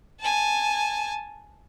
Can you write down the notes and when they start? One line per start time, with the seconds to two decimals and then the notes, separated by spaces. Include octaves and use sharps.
0.20 G#5 A5